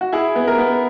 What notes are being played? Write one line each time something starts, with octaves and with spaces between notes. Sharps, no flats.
F#4
E4 G#4
B3
A#4
B3